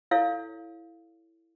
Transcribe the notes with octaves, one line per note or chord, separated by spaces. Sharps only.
E4 A4 C#5 F5